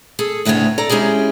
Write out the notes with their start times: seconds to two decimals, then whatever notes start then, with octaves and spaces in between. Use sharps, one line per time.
0.19 G#4 A4
0.45 D2 A2 C#3 B3 C#5
0.78 A4 D5 A#5
0.90 G#3 C#4 E4 G4 G#4